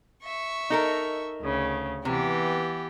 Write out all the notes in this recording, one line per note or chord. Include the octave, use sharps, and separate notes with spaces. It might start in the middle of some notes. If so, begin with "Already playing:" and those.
E5 C#6
D#4 A4 A#4
D2 C#3
C3 E3 B3 G4